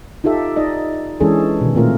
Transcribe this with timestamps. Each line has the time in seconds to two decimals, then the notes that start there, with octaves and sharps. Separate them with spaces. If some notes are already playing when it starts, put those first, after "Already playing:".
0.24 D#4 F4 G4 A4 E5
0.56 D#4 D5 D#5
1.20 E3 G#3 C#4 D4 G#4 A4
1.61 B2 D#3
1.75 A#2 A3 C4 F4 A#4